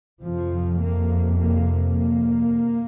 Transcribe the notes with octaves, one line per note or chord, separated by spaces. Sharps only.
F2 C3 F3
A#3
A#3
A#3